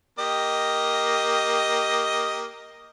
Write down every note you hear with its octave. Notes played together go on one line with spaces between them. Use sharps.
A#3 G4 D#5